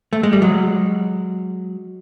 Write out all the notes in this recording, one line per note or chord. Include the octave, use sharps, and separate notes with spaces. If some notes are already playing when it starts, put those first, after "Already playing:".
A3
G#3
G3
F#3 G#3